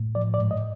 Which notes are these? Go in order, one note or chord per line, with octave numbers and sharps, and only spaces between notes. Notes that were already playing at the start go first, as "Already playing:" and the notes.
Already playing: A2
F3 D5
D5
G#2
D#5